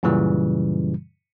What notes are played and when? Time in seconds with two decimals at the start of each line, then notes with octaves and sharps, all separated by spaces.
0.03 F#2 A#2 C#3 E3 G3